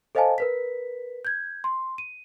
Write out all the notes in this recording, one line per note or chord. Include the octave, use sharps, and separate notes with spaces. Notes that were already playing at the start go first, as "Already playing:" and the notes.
A4 C5 D#5 F5 G#5 A5
A#4 B4 B6
G6 G#6
C6
D#7